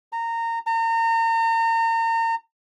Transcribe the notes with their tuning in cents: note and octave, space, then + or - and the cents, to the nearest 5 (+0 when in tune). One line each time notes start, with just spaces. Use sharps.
A#5 -20
A#5 -35